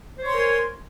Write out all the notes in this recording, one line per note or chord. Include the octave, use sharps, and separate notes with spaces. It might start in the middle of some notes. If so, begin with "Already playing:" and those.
A#4 C5 C#5 G#5 C6